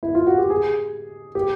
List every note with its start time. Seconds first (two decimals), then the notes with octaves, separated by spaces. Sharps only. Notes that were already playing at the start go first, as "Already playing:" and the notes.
0.03 E4
0.15 F4
0.27 F#4
0.38 G4
0.50 G#4
1.35 G4